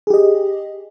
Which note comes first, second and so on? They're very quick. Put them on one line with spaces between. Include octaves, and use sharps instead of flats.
G#4 G4 D#5